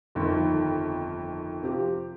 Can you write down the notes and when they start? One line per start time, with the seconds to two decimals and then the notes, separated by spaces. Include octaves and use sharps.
0.15 G1 F2 D#3
1.62 C3 F3 C4 G4